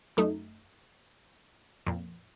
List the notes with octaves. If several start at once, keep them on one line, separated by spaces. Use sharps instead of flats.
F#2 A3 D#4
F2 A#2